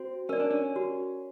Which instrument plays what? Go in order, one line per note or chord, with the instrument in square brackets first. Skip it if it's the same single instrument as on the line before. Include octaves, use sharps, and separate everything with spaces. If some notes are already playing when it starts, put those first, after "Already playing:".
Already playing: [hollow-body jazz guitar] C4 [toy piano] F#4
[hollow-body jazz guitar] C#4 [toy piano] A#4 D5
[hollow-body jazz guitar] D4
C#4
[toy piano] F#4